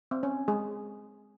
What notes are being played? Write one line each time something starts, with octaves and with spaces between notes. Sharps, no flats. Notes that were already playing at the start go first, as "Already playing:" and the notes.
C4
C#4
G#3 G#4